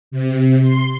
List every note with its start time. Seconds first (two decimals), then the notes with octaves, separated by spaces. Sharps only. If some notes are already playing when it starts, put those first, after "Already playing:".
0.11 C3
0.61 C6